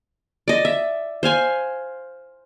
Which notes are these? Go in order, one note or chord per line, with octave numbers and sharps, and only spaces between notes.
D5 D#5
E5
C5 F5 G#5 C6